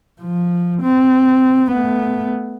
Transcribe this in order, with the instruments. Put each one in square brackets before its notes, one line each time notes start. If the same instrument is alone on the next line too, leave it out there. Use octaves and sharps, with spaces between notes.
[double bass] F3
C4
A3 B3